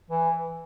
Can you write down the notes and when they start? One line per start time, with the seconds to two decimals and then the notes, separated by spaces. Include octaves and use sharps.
0.11 E3